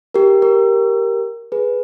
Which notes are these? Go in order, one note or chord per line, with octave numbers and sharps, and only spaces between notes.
G4 A#4
G4 A#4
G#4 B4